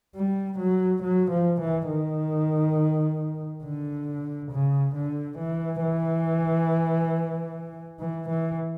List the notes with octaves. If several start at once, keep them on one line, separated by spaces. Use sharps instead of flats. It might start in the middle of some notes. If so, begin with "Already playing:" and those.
G3
F#3
F#3
F3
E3
D#3
D3
C#3
D3
E3
E3
E3
E3